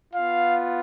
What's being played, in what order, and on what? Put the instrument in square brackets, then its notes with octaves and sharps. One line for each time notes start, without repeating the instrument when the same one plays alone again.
[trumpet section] B3 F4 F5